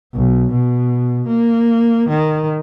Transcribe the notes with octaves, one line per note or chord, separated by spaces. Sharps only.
B1
B2
A#3
D#3